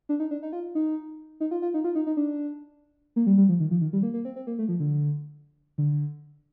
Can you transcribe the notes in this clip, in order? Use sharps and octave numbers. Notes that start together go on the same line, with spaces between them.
D4
D#4
D4
D#4
F4
D#4
D#4
F4
F4
D#4
F4
D#4
D#4
D4
A#3
G3
G3
F3
D#3
F3
D#3
G3
A#3
A#3
C4
C4
A#3
A3
F3
D3
D3